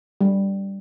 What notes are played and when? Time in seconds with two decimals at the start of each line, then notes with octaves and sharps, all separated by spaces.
0.21 G3